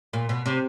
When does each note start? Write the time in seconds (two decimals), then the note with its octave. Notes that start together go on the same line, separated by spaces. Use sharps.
0.13 A#2
0.29 B2
0.46 C3